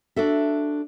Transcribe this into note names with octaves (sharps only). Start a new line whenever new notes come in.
D4 F#4 A4 E5